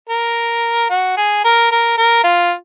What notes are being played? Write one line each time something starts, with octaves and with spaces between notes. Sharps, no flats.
A#4
F#4
G#4
A#4
A#4
A#4
F4